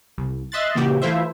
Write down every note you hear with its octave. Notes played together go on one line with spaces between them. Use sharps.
C2
D#5 E5 C6 F#6 A6
A#2 C#3 E3 A#3 F#4 G4
E3 A3 E4 F4 C5 E5